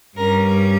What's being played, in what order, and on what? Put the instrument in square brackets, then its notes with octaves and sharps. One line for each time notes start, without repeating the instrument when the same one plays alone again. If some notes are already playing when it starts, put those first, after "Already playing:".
[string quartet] G2 G3 C#4 A#4